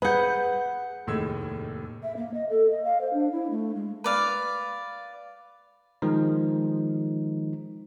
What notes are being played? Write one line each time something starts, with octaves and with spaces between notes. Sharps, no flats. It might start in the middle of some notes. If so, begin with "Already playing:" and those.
G#4 B4 F#5 G6
F1 D#2 A2 G#3 E6 G#6
E5
A#3
D#5
A4
D#5
F5
C5
D4
E4
A3
G#3
B4 D5 F5
D#3 F3 G#3 D#4